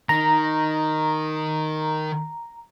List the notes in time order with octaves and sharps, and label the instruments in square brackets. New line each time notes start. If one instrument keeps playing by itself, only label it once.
[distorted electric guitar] D#3 [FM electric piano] A#5